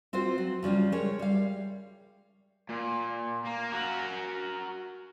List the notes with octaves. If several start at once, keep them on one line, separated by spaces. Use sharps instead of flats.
C4 F4 F#4 C5
F#3
C#3 F3 G3 F4
G#3 A#4 C#5
G3 F5
A#2
A#3
F#4 A#4